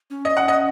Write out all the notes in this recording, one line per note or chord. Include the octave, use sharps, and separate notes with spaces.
C#4
D#5
F#5
D#5